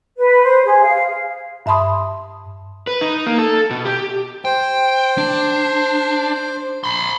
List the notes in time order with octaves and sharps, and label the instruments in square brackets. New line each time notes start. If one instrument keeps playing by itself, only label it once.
[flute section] B4
C5
G#4
F5
[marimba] G2 E5 A5 B5 C6 D#6
[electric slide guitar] B4
D#4
A#3
A4
B2
G4
[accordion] C5 [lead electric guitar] G5
[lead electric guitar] D4
B5 C6